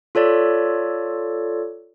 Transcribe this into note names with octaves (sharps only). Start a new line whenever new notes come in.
F4 A4 C#5 D5